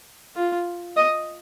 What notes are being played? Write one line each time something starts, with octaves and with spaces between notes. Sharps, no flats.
F4
D#5